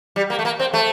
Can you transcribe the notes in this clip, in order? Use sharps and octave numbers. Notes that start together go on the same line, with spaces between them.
G3
A#3
A3
A#3
C4
A3